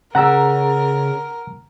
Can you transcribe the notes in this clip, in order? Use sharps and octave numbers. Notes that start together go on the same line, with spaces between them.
C#3 A#4 F#5 A#5 E6